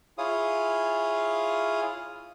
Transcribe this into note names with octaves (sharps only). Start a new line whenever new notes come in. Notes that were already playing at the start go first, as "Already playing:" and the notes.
E4 F4 G#4 C#5 F5 D#6